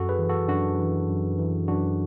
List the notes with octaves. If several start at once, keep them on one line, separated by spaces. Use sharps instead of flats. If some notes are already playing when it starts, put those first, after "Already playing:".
Already playing: F#2 F#4 A4
G#4 B4
E3
F#4 A4
F#2 D4 F#4
E3
F#2
E3
F#2 D4 F#4